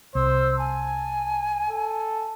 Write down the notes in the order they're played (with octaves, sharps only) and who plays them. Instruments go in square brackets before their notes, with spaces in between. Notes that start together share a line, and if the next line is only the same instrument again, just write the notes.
[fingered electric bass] C2 [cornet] C5 [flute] E6
[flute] G#5 [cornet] A5
[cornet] A4